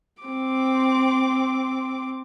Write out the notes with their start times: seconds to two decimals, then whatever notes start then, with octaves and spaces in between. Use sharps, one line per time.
0.23 C4 D6